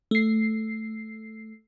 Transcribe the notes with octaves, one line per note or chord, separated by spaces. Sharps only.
A3 C7